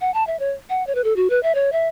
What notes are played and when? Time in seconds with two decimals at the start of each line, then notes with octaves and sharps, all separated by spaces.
0.01 F#5
0.14 A5
0.27 E5
0.40 C#5
0.70 F#5
0.87 C#5
0.95 B4
1.04 A4
1.16 F#4
1.30 B4
1.43 E5
1.55 C#5
1.72 E5